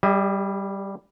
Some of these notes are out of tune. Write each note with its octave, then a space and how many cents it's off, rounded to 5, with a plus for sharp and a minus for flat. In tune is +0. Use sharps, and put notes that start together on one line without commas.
G3 +0 G#4 -45 E5 -45